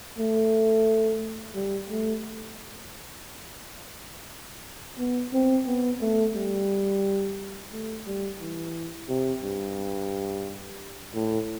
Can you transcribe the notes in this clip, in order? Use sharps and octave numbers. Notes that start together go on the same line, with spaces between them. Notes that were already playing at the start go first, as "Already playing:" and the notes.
A3
G3
A3
B3
C4
B3
A3
G3
A3
G3
E3
C3
G2
A2